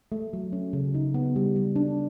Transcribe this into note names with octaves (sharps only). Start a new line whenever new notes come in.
A3
F#3
C#4
C#3
D#4
B3
G3
G3
D4